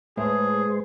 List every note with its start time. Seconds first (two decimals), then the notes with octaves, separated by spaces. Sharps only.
0.17 A2 G#3 G#4 B4 C5 E5